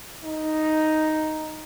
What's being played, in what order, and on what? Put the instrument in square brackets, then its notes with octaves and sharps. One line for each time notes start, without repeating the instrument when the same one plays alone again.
[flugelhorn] D#4